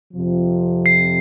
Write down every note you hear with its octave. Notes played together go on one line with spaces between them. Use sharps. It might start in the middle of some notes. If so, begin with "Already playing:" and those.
F2 C3 F3
C7